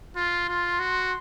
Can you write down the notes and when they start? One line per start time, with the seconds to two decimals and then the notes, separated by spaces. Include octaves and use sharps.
0.16 F4 C6
0.49 F4
0.80 F#4